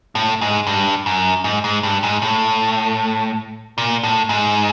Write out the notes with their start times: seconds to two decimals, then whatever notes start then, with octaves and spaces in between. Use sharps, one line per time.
0.15 A2
0.41 G#2
0.67 G2
1.06 F#2
1.44 G#2
1.64 G#2
1.83 G2
2.03 G#2
2.22 A2
3.78 A#2
4.03 A2
4.29 G#2